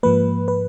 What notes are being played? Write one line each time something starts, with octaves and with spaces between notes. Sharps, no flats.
G#2 F3 A#3 B4
B4